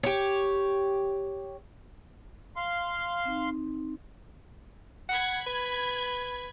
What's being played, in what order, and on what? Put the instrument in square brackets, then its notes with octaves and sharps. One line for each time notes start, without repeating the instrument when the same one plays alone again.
[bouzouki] G4 C#5
[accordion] F5 C6
[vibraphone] C4 D#4
[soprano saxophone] F#5 [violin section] B5 G#6
[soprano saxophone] B4